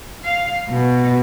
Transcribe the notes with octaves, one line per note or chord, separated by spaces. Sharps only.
F5
B2